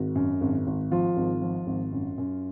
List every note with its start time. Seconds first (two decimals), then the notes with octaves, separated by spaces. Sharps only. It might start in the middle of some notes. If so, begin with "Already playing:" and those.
Already playing: G#1 F#4
0.15 F#2
0.41 G#1
0.67 G#1
0.92 F3 F4
1.17 G#1
1.42 F3
1.67 G#1
1.92 F#2
2.18 F#2